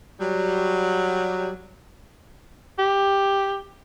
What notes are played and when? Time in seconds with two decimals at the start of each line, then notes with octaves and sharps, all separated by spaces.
0.20 F#3 G3
2.79 G4